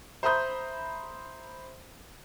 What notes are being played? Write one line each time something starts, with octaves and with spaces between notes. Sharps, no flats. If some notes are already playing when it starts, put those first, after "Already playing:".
C5 E5 A#5 B5 D#6 G6